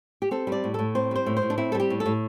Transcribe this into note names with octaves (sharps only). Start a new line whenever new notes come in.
G4
C4 A4
G3 D5
A2
A2 A4
C4 C5
G3 C5
A2
C5
A2
D4
C4 E4
A4
G3
G4
A2
A4
A2